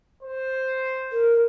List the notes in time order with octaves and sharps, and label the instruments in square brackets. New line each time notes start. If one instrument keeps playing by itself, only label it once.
[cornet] C5
[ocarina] A#4